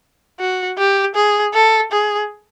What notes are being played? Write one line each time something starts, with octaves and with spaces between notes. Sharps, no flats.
F#4
G4
G#4
A4
G#4